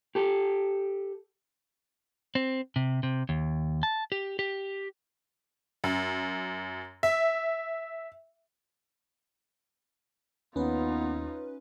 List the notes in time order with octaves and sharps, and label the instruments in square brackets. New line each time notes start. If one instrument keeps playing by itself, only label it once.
[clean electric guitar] G4 A4
C4
C3
C3
D#2
A5
G4
G4
[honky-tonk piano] F#2
E5
[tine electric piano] D#2 [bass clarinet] B3 [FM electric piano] C#4 B4 [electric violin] D#4 F4